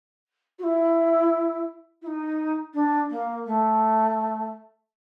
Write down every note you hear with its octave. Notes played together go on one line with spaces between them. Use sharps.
F#4
E4
E4
D#4
D4
A#3
A3